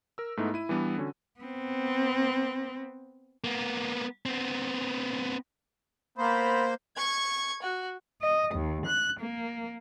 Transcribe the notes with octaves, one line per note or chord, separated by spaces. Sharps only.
A#4 E6
G#2 A3 B3 D#4 E4
E4 D#7
E3 G3 B3 D4
D3 C#4 F#4
B3 C4
A#3 B3
B3 C4
A#3 B3 A#4 C5 B5
C#6 G#6
F#4
D#5
D#2
F#6
A#3